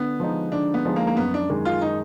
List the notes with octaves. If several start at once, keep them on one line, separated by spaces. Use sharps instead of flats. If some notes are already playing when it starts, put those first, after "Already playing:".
Already playing: D3 B3
F3 G#3 D#4
D3 D4
B3
F3 G#3 D#4
A#3
A#3
F#2 B3
D4
D#3 G#3
F4
D#4